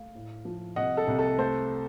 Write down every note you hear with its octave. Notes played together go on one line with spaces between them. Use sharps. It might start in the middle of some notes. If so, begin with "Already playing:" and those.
Already playing: A3 F5
A2
F3
C2 D#5 F#5
A4
C2
A4
A3 A4 C5